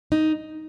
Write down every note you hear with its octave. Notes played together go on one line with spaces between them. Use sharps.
D#4